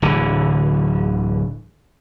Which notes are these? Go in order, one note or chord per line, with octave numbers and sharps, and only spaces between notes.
D1 D3 E3